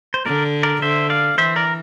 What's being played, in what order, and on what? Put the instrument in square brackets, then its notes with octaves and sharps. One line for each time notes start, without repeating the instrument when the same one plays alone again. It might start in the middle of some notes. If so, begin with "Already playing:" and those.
[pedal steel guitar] C5
[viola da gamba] D3 [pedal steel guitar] A#4 D5
[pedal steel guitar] A#4 D5
[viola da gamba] D3 [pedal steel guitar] C5 E5
[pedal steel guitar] D5 F5
[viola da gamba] E3 [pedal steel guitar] C5 E5
[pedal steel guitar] A#4 D5